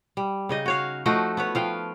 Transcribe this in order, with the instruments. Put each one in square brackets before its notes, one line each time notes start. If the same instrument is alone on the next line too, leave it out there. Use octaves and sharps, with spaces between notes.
[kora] G3
C#3 D#4 D#5
F#4 C#5 F5
F3 A3 D#4 F#4
B3 B4 C#5
F3 F5 G5